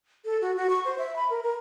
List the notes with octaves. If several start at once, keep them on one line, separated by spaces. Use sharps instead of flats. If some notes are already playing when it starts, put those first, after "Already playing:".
A4
F#4
F#4
C#6
C5
E5
B5
A#4
A#4